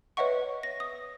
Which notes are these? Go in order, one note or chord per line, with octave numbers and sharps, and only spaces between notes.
B4 C#5 D#5 E5 F#5 C#6
A#6
D#6